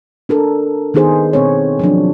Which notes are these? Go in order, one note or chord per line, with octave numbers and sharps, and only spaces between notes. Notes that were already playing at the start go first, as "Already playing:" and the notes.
D4 A4 A#4
D#3 B3 D#4 G#4 C5
B2 C4 C#5
F3 F#3 D4